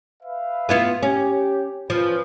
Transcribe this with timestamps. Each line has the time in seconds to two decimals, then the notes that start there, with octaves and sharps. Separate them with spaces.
0.23 B4 E5 F5
0.69 B3 E4 F4
1.02 C#4 G4
1.90 F3 C#4 B4